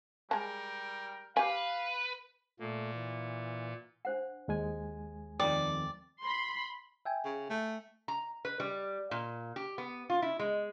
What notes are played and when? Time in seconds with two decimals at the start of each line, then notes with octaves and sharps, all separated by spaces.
0.31 G3 G#3 A#4 G5 A5
1.37 G4 B4 F5 G#5
2.60 A#2 A3 A#3
2.94 E3
4.05 D4 C5 F#5
4.48 D#2 G#3 G#5
5.40 F2 D#3 D5 G5 A#5
6.23 B5 C6
7.05 E5 G5 G#5
7.25 C#3
7.50 A3
8.08 A#5
8.45 B4
8.60 G3
9.11 A#2
9.56 G4
9.78 B3
10.10 F4
10.22 E4
10.39 G#3